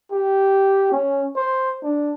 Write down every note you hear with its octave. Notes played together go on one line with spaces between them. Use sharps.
G4
C#4
C5
D4